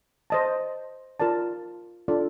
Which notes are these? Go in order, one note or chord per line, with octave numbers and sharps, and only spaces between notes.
C5 D#5 A5
F4 A#4 D5 A5
D4 F4 A4 D5